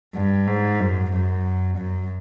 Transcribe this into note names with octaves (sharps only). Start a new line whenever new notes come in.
G2
G#2
F#2
F#2
F#2